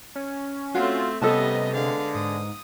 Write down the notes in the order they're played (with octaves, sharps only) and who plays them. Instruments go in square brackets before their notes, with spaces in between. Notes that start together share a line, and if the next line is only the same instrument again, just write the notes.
[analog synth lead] C#4
[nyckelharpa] A3 C4 [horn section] F4 [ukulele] F#4
[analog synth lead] C3 [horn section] G3 D#5 [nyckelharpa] B3 C#4 [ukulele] A4 B4 A5
[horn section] D3 G#3 [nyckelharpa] F5
[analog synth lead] G#2 [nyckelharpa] D#6